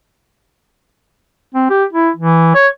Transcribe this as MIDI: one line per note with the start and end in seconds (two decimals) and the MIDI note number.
1.55 1.66 60
1.70 1.84 67
1.93 2.10 64
2.16 2.52 52
2.55 2.68 73